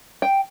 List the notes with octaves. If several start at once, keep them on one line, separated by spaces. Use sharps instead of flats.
G5